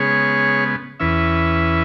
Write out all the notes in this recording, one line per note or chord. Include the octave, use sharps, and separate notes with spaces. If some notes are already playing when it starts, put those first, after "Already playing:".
Already playing: C#3 G#3 B3 G#4 C#5
E2 E3 C#4 B4 E5